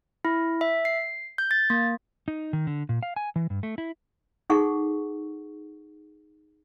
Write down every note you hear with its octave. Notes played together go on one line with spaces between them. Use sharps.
E4
E5
C7
G6
A6
A#3
D#4
D#3
D3
A#2
F5
G#5
E3
G2
A3
E4
D#4 G#4 A4 F#5 C#6